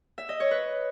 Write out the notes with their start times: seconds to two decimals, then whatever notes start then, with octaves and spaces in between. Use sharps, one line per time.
0.18 E5
0.29 D#5
0.40 C#5
0.51 B4